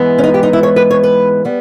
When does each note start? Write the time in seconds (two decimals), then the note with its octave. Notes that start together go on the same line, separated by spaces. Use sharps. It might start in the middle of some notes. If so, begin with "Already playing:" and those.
Already playing: G#2 E3 G#3 B3
0.18 C#4
0.24 D#4
0.34 G4
0.43 D#4
0.53 E4
0.63 C#5
0.76 B4
0.91 C#5
1.03 B4
1.45 G3 B3